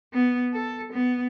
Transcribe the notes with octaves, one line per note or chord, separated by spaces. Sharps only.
B3
A4
B3